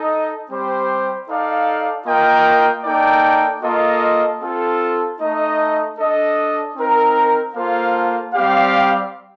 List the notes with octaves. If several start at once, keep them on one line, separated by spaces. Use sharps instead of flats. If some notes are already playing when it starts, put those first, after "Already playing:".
Already playing: D#4 A4 D#5
G3 C4 G4 C5
D#4 A4 D5 F5
A#3 F4 A#4 D#5 G5
A#3 D#4 A4 D5 G5
A#3 F4 A4 D#5
C4 F4 A4
A3 D#4 A4 D#5
D4 A4 D#5
C4 D#4 A#4
A#3 F4 A4 C5 F5
G3 C4 G4 D5 F5